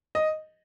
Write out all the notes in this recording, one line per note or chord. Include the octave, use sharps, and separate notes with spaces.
D#5